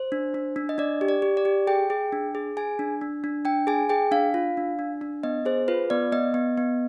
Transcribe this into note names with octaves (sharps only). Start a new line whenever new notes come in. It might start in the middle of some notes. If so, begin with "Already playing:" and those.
Already playing: C5
D4
D4
D4
D#5
D4 D5
G4
D5
G4
D5
G4
G#4 G5
G#4
D4
G#4
G#4 G#5
D4
D4
D4
D4 G5
G#4 G#5
G#4 G5
D4 F5
F4
D4
D4
D4
B3 D#5
G#4 C5
F4 B4
B3 D5
B3 D#5
B3
B3